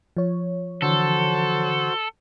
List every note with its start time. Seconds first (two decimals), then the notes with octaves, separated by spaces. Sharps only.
0.17 F3 C#5
0.82 D3 E3 F#4 A4 C5